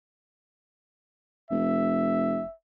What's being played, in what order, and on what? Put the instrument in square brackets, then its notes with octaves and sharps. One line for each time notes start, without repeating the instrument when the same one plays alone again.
[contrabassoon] F1 [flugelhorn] E5